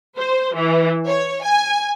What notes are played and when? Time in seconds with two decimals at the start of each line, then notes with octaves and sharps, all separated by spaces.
0.16 C5
0.54 E3
1.07 C#5
1.43 G#5